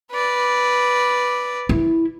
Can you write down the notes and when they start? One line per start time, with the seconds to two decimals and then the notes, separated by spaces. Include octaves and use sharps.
0.12 B4 D5
1.69 E4